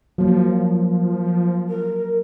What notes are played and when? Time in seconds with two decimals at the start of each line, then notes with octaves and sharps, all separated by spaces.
0.18 F3 F#3 A#3
1.69 A#4